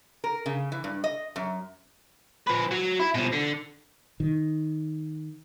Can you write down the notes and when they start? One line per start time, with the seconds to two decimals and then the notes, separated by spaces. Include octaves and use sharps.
0.24 A#4
0.46 C#3
0.72 E3
0.84 G2
1.04 D#5
1.36 F#2
2.47 F3 B4
2.71 F#3
3.00 E4
3.15 B2 F3
3.33 D3
4.20 D#3